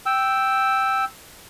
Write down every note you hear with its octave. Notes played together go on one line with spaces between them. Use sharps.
G5 E6